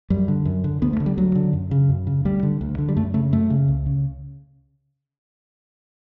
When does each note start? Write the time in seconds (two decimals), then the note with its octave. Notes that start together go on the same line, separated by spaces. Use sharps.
0.10 F#2 G3
0.28 D3
0.45 F#2
0.64 D3
0.82 D2 B3
0.93 A3
1.00 D3
1.06 G3
1.17 D2 F#3
1.35 D3
1.53 F#2
1.71 C#3
1.89 F#2
2.07 C#3
2.25 D2 G3
2.43 D3
2.61 D2
2.78 D3
2.89 G3
2.96 F#2 A3
3.14 C#3 A3
3.32 F#2 A3
3.50 C#3
3.68 C#2
3.86 C#3